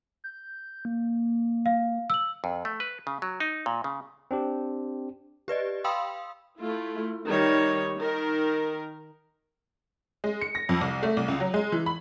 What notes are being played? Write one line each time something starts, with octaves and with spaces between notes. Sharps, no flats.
G6
A#3
F5
E6 F#7
F2
A3
B4
C#3
F#3
D#4
A#2
C#3
C4 D4 G4
G4 B4 D5 D#5
F5 G5 B5 C6 D#6 E6
A3 E4 F4
D#3 G3 C#5
D#3 A#4
G#3
C#7
A#6
F2
C2
A3
C2
C#2
F#3
G#3
E3
B5